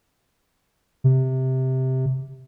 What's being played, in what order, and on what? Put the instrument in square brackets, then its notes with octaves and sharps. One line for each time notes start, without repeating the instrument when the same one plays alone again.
[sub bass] C3